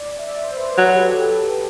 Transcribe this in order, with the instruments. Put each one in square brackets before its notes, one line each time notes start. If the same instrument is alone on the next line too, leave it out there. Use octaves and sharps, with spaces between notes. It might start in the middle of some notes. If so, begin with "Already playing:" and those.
Already playing: [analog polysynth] D5
E5
D5
C5
B4
C5
[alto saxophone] F#3 [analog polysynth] B4
[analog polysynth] A4
G4
G4
A4
G4